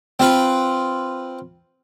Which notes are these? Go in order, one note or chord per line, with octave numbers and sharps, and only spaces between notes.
C4 F4 B4